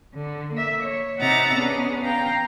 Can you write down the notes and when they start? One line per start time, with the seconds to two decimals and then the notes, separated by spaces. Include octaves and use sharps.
0.14 D3
0.52 A#3 E5
0.83 C#5
1.19 C3 D#4 E5 F#5 A#5 A6
1.54 B3 C#4 D4 G#4
2.02 F5 G5 A#5